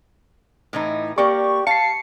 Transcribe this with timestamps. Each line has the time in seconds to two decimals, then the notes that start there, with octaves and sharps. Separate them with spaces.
0.73 A2 E3 D#4
1.18 A#3 G4 A#4 D5 C#6
1.67 F5 A5 C7 C#7